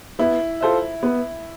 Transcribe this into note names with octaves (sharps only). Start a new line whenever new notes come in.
B3 E4
F4 A4 C5 E5
B3